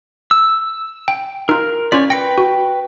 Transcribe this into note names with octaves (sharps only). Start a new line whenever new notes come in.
E6
G5
D#4 F4 A#4
C#4 F4 C#5 D5 B6
B4 G5 A#6 C#7
F#4